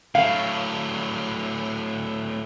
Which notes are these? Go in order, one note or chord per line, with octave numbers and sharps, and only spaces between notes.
A2 F#3 F5